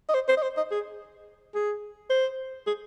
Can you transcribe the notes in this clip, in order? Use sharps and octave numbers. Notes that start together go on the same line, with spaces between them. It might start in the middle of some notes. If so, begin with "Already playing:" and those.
D#5
C5
C5
D#5
C5
D#5
G#4
G#4
C5
G#4